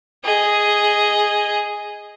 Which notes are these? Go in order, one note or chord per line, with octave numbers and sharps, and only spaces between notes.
G#4 D#5